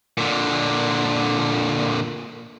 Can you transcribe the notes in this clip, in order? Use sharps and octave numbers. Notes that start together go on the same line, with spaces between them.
A#2 D3